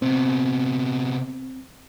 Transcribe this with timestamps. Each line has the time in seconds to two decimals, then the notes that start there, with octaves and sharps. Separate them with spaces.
0.02 C3 B3 C4